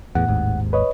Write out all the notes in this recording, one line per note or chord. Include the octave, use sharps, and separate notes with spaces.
E2 A2 F#5
G#1 D#2 G#2
B4 C#5 D#5